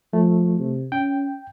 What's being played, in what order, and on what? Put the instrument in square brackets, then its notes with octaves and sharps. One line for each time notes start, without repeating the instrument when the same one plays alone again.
[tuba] F3 [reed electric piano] A3
[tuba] C3
[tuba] C#4 [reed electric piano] G5